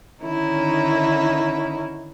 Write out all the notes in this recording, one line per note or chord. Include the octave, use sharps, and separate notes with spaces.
D3 D#3 C#4 D#4 E4